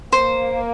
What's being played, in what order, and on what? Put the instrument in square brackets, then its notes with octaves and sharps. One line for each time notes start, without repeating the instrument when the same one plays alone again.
[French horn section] A#3 [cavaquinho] C5